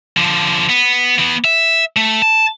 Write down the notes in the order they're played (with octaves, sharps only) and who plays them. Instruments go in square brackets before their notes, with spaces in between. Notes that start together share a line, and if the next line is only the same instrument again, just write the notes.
[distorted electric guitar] D3 F3
B3
E3 B3
E5
A3
A5